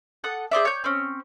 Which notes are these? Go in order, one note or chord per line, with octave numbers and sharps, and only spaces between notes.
A4 F#5 D#6
G#4 C5 D5 E5
C#5 G6
C4 C#4